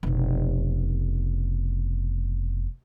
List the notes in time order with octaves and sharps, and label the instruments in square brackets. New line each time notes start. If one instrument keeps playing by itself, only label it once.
[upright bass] F1 B2